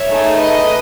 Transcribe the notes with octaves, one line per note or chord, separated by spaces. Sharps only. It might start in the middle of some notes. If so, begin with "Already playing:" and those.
Already playing: C#5 E5
A3 D#4 G#4
B4 D#5